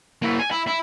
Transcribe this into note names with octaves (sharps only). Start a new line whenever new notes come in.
A#3 E4
G#5
E4
E4